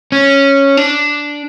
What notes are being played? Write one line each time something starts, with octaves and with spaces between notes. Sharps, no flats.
C#4
D4